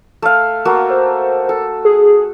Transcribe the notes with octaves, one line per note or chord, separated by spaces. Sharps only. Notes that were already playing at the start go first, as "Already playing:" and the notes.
A3 F5
A3 A#3 F#4
C5
A4
G#4